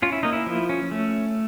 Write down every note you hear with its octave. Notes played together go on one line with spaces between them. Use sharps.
C#4 F4
E4
A#3 D#4
E4
F3
C#4
A3